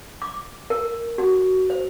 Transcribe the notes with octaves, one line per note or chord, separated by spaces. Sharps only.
D6
A#4
F#4
C5